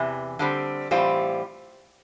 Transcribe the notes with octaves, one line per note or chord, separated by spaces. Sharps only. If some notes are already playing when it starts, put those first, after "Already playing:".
Already playing: E2 C3 E3
D3 G3 C4
A2 E3 G3 C4 F4